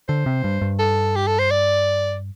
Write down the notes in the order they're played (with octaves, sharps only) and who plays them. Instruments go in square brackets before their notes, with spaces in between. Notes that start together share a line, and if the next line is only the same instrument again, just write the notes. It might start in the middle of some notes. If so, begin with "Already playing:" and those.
[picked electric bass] D3 [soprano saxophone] C5
[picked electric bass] C3
G2
G2
[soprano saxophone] A4
G4
A4
C5
D5